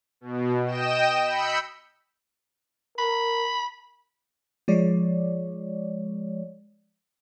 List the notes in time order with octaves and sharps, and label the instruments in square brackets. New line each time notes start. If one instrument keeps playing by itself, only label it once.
[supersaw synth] B2
D#5 G5 E7
B5 E6 G6 C#7
[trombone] A#4 [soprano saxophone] B5
[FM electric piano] F3 G#3 C#5 D5